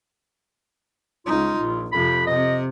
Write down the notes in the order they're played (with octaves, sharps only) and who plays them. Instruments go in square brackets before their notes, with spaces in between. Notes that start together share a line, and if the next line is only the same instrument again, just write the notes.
[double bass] C#2 D#4 [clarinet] F4
[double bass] A#1
[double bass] F2 C3 [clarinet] B5
[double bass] C3 [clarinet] D#5